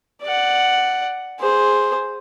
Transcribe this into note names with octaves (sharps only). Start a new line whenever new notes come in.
D5 F#5
G#4 C5